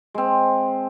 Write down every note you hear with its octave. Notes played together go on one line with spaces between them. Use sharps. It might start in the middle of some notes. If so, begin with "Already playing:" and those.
G#3 C4